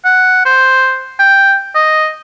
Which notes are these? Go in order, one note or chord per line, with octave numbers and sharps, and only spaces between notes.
F#5
C5
G5
D#5